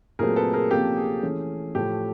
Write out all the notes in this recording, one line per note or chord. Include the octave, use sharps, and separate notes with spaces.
A#2 F#3 A3 C4 G#4 A#4
A4 B4
G#4 A#4
C3 F3 A#3 C#4 G4 A4
G#4
E3 A3 C#4
A2 F3 A3 G4